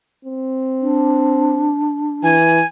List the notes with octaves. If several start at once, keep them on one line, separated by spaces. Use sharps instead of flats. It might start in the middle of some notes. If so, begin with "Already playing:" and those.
C4
D4
E3 G#5